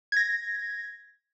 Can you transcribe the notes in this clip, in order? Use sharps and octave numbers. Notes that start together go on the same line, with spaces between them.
G#6 A#6